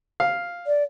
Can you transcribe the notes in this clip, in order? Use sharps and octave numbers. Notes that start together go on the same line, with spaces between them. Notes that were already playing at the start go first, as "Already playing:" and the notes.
F5
D5